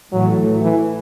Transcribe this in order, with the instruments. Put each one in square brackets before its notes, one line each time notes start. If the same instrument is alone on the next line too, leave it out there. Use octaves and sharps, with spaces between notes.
[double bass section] A2 E3 A3 [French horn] F#3
[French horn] E3